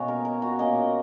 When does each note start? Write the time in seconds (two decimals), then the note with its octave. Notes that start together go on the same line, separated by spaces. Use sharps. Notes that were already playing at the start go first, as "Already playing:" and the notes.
Already playing: B2 A#3 C#4 C#5 D#5
0.08 A#4
0.25 A#4
0.42 F#4
0.59 A#2 A#3 C#4 D#5